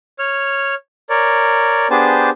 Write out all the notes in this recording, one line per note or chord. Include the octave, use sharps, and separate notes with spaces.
C#5 F6
A#4 C#5 D5
B3 D4 G4 G#4 C5 A5